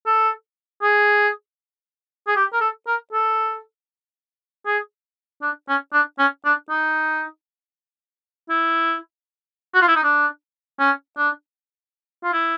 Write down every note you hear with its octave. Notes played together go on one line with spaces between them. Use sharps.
A4
G#4
G#4
G4
A#4
A4
A#4
A4
G#4
D4
C#4
D4
C#4
D4
D#4
E4
F#4
F4
E4
D#4
D4
C#4
D4
F4
E4